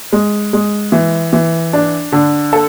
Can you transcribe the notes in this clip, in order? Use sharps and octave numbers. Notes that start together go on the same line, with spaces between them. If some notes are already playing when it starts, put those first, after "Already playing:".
G#3
G#3
E3
E3
D4
D3
A4